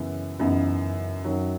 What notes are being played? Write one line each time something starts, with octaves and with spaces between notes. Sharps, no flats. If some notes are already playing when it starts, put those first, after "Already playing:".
Already playing: F#2 C#3 E3 B3
F#2 C#3 E3 B3 D#4
F#2 D#3 F#3